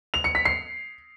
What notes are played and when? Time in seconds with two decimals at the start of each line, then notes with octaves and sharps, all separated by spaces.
0.14 F7
0.24 C#7
0.35 B6
0.45 C7